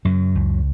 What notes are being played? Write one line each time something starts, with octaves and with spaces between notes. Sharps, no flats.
F#2 C#3 F#3
C#2